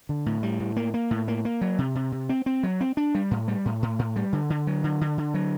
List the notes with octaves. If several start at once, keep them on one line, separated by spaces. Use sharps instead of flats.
D3
A2
G3
A2
A#3
A#3
A2
A#3
A#3
F#3
C3
C3
C3
C4
C4
F#3
C4
D4
G3
A2
G3
A2
A2
A2
G3
D3
D3
F#3
D3
D3
D3
F#3